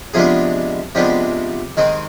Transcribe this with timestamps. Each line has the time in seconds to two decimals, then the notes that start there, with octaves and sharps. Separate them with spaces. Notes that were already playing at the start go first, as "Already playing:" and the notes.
0.14 C3 F3 G#3 B3 D4 G#4
0.95 C3 F3 G#3 B3 D4 G4
1.77 D#3 G#3 C4